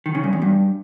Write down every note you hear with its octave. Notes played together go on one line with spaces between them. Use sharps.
D#3
C#3
G2
E2
G2